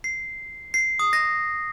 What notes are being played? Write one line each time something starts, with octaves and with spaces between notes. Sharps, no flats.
C7
C7
D#6
A#6